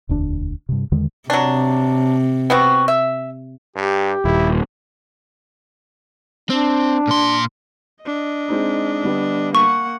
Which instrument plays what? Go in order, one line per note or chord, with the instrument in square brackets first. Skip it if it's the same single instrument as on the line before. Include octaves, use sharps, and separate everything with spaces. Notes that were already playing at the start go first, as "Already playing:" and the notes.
[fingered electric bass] E1 D2 D4
G2 C3
E2 D3 D#3 G#3
[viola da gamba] C3 [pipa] F#3 D4
[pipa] B3 C4 F#4
E5
[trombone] G2 [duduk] G4
[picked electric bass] D#1 [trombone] E4
[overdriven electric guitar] C4 [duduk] D4
[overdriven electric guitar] A#2 C6
[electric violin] D4 D#5
[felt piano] G#3 C4 D#4
D3 G3 B3
[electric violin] A#3 F#5 [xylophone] C#6